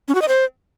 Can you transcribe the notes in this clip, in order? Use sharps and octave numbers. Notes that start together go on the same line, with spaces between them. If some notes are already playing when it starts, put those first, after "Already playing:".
C#4
F#4
D#5
C5